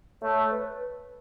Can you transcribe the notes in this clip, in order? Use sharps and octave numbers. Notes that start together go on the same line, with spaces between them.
A3 C#5
B4